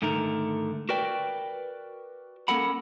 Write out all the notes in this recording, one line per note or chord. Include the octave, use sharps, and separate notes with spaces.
G#2 D3 D#3 A3 A#4
F#4 A#4 B4 D5 G5
A#3 C#4 A4 A#4 F#5 B5